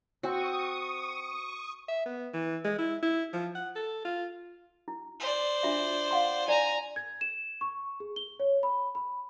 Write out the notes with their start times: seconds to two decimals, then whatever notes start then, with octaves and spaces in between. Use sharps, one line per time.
0.23 C4 F#4 C#6 D#6
1.88 E5
2.06 B3
2.33 E3
2.64 G#3
2.78 E4
3.02 E4
3.33 F3
3.55 F#5
3.75 A4
4.05 F4
4.88 E4
5.20 C5 D5
5.63 D4 F4 E5
6.11 F5 F#5 C6
6.48 E4 D5 G#5 A#5
6.96 G#6
7.21 E7
7.61 C#6
8.00 G#4
8.16 G7
8.40 C#5
8.63 B5
8.95 B5